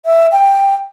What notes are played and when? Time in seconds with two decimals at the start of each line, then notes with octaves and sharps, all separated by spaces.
0.05 E5
0.32 G5